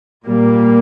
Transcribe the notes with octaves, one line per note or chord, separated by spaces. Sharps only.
A#2 G3 A#3